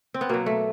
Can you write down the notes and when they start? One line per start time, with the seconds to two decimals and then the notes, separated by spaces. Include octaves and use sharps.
0.14 C4
0.21 B3
0.29 B2 F#3 A#3
0.46 A3